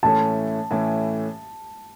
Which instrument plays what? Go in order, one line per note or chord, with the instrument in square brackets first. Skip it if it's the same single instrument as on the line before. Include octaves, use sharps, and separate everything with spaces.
[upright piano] A2 E3 A3 C#4 [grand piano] A5
[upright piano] A2 E3 A3 C#4